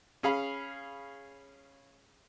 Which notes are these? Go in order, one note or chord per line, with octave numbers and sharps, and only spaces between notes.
C#4 G#4 F5 B5